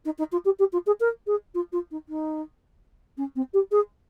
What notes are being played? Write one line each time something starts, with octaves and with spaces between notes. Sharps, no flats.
D#4
D#4
F4
G4
G4
F4
G#4
A#4
G#4
F4
F4
D#4
D#4
C#4
C4
G4
G#4